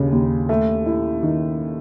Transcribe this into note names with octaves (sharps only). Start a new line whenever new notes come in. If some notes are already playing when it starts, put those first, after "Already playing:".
Already playing: D#2 C#3
D#2
A3
E4
D#3